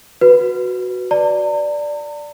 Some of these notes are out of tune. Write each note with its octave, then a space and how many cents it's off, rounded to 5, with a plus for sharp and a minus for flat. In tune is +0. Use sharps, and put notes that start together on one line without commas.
F#4 +0 B4 +0
D5 +0 A#5 -40